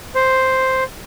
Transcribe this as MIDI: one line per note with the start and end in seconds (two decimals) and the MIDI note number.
0.15 0.84 72